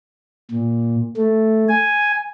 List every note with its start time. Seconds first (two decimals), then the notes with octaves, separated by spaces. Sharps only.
0.51 A#2
1.17 A3
1.69 G#5